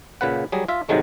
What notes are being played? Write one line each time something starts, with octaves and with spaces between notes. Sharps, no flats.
A#2 C#3 B4 F#5
F#3 G3 G#4
F4 E5
G#2 C3 D#3 F#3 G#3 A3